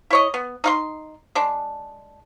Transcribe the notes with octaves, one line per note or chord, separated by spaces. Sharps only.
E4 C#5 D#5
B3
D#4 F5 C6
G#3 D4